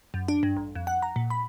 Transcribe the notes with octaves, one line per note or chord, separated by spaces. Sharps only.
F#2
D4
G2
A1
F2
F#5
A#5
A#2
B5